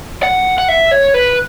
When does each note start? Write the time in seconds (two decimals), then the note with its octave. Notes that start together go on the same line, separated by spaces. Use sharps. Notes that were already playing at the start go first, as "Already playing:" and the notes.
0.23 F#5
0.58 F#5
0.69 E5
0.91 C#5
1.14 B4